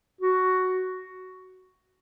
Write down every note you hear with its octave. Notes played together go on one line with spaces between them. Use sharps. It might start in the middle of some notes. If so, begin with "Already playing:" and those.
F#4